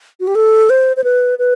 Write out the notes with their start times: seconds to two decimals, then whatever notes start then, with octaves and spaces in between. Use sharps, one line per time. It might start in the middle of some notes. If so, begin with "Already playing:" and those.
0.20 F#4
0.27 G4
0.35 A4
0.70 C5
0.97 C5
1.04 B4
1.39 B4